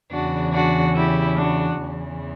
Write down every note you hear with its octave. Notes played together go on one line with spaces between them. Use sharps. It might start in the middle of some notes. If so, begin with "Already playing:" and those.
E2 C#3 E3 D4 F#4
D4 F#4
E4 G4
D4 F#4
E2 C#3 E3